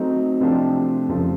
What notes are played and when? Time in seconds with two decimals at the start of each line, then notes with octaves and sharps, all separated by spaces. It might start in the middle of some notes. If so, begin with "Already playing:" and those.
Already playing: F#3 A3 C4 D#4
0.40 C3 F3 A3 D4 G4
1.08 F2 C#3 F3 A3